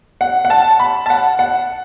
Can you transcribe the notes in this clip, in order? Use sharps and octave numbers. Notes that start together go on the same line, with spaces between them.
F#5
F#5
A5
B5
A5
F#5
F#5